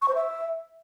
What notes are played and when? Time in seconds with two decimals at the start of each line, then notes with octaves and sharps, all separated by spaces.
0.02 C#6
0.08 C5
0.15 E5